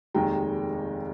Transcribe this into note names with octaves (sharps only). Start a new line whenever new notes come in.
F1 D#2 D#3 G#3 G5 A#5